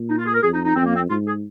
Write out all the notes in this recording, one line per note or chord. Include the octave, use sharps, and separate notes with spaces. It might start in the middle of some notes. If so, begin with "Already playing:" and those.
Already playing: A#2
D#4
F4
G#4
A#4
F2 G#4
D#4
D#4
F2 C4
A#3
C4
G#2 F4
G#4